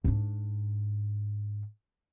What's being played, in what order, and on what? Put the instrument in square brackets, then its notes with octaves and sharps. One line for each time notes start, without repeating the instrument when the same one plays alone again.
[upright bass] G#2 D4